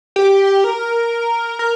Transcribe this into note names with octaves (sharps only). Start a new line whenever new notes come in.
G4
A#4
A#4